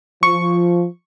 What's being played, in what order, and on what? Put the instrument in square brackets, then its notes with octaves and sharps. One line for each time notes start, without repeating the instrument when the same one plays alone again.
[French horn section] F3 [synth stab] C#6